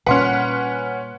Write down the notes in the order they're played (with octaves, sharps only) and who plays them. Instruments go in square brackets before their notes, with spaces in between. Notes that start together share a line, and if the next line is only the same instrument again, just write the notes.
[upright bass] A#2 G3 [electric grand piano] C#4 B4 [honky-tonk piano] F#5 C6 F6